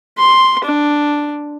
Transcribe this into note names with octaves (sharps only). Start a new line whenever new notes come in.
C6
D4